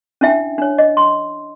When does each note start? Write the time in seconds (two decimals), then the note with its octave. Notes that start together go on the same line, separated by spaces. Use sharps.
0.21 C#4 D4 E4 E5 G5
0.58 D4 C#5
0.78 D#5
0.97 C6